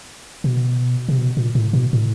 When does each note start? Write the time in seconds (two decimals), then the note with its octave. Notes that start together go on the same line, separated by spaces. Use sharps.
0.44 B2
1.08 C3
1.18 B2
1.37 A#2
1.55 A2
1.73 B2
1.93 A2